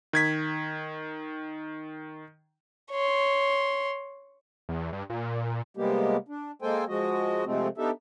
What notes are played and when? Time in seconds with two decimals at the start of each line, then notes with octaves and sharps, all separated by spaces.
0.13 D#3 G#6 B6
2.91 C#5 C6
4.69 E2
4.93 G2
5.10 A#2
5.77 C3 G3 G#3 A#3 B3 G4
6.28 D4
6.62 G#3 A#3 A4 C5 G5 G#5
6.88 F3 G#3 F#4 D#5
7.45 C3 F3 G#3 A3 C4
7.78 B3 D4 D#4 G4 A4 E5